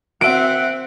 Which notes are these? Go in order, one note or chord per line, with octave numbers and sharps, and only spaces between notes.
C4 F#4 E5 F#5 D7